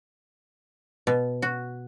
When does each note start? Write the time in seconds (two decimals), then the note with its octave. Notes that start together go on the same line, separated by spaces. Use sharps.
1.07 B2
1.42 F#4